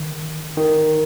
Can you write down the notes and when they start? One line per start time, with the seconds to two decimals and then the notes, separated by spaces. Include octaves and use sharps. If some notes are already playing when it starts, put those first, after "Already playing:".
Already playing: D#3
0.57 D#3